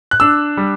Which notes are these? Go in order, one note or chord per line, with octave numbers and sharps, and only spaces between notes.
F#6
D4 E6
G3